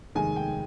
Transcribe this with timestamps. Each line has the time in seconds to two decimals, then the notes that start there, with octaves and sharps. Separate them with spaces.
0.15 F1 D#2 D#3 G#3 G#5
0.36 G5